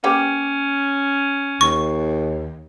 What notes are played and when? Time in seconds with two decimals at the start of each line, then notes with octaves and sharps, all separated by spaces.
0.04 A#3 C#4 G4 B4
1.61 D#2 C#6